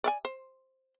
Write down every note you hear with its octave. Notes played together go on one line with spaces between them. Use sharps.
D5 E5 G#5
C5